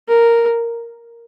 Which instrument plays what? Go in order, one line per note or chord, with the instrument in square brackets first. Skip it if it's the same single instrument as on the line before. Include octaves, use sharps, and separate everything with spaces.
[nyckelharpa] A#4